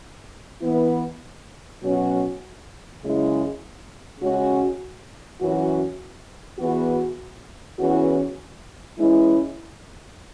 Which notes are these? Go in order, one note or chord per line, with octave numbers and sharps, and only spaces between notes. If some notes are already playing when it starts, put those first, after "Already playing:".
E3 B3 E4
B2 F#3 C#4 F#4
F#2 C#3 G#3 E4
C#3 G#3 C#4 F#4
F#2 E3 C#4 F#4
E2 E3 B3 F#4
E2 E3 C#4 F#4
E3 G#3 C#4 E4